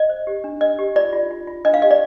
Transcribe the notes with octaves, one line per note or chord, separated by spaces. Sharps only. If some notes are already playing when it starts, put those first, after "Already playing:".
Already playing: D#5
C5
G4
D4
D4 D#5
G4
F4 D5
F4
F4
F4
D4 D#5
F5
G4 D#5
D5